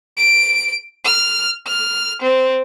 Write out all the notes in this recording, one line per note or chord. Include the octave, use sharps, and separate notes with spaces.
D7
F6
F6
C4